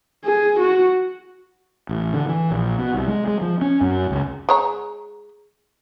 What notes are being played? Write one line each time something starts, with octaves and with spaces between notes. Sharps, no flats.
G#4
F#4
A1
D3
E3
A#1
B2
C2
G#3
G#3
F3
C#4
F#2
C#2
G#3 C#5 A#5